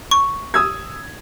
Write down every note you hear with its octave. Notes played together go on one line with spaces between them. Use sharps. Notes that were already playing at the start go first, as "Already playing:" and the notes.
C#6
D#6 E6 G#6